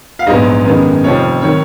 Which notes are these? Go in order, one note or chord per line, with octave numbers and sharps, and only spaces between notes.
F5
A#1 G#2 F#3 B3 D#5
F#2 D#3 G#3 B3
F1 F2 F3 C#5
D#3 F#3 C#5